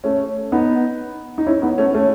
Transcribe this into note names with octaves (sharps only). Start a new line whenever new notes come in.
A3 C#4
B3 D#4
D#4
C#4 E4
B3 D#4
A3 C#4
A3 C#4